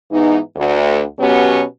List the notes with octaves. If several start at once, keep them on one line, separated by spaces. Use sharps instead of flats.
G#2 E3 B3 D#4
D2
B2 F#3 B3 C#4 G4